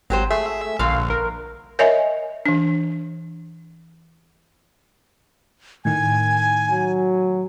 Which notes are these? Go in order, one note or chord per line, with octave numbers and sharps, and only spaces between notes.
G#1 F#3 G4 C5
A3 G#4 E5
A#1 G2 D3 F5
A#4
A#4 C#5 D#5 E5 G#5
E3 D4
A2 D#3 G#5 G#6
F#3